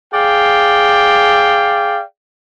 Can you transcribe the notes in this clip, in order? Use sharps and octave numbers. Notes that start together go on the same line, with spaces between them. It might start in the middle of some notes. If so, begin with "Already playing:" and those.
G#4 D5 F5 G5